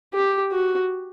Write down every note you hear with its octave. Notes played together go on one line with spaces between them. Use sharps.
G4
F#4